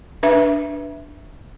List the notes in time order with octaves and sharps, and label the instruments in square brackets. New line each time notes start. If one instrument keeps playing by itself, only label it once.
[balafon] D4 B4 E5